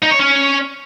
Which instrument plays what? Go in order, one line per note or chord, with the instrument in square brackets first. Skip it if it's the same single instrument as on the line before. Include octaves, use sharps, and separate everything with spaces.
[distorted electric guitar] D#4
C#5
C#4